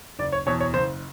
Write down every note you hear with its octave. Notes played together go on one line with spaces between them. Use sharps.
F#1 D5
C#5
E2 B2 C#5
C#5
F#1 C5